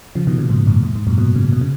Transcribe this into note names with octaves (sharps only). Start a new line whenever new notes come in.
C#3 F3
B2 D#3
A#2 C#3
G#2 B2
F#2 A#2
G#2
G#2
F#2 A#2
G#2 B2
A#2 C#3
B2
C#3